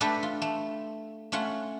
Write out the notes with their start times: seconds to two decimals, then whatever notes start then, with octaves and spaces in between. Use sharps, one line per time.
0.01 A3 D4 G4 A4 B4 D5
0.23 F4
0.42 A3
1.32 A3 C#4 F4 F#5